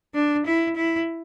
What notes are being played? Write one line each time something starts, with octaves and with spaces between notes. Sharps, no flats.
D4
E4
E4